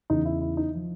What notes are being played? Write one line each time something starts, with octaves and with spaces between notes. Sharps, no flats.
E2 C#3 E3 D#4
E4
E4
D#4
F3